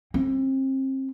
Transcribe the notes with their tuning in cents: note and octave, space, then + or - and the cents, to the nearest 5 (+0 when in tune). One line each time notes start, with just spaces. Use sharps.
C4 +30